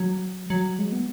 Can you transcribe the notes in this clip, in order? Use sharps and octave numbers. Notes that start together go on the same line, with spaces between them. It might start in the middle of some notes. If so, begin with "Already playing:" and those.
Already playing: F#3
F#3
G#3
B3